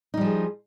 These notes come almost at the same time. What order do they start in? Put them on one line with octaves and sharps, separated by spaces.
D#4 G3 F3 G#4